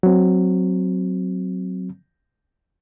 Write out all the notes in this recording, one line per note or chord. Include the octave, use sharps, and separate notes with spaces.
F#3 C4